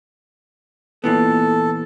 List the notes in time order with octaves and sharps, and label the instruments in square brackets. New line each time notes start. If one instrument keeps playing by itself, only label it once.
[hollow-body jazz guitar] A#2 E3 B3 [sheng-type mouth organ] A4